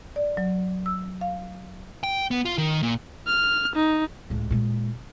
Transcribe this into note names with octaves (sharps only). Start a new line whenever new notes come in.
D5
F#3
E6
F5
G5
B3
F4
D#3
A#2
F6
D#4
C#2 A2
A#2 G#3